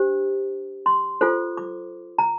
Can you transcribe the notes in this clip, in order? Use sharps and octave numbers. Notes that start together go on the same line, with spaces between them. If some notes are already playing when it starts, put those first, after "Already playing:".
Already playing: D4 G4 C5
C6
F4 A4 C5
D6
A#5